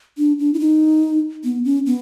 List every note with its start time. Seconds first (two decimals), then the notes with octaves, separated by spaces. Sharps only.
0.18 D4
0.39 D4
0.54 E4
0.60 D#4
1.44 B3
1.65 C#4
1.86 B3